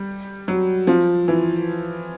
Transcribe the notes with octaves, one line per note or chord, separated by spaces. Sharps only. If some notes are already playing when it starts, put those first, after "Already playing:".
Already playing: G3
F#3
F3
E3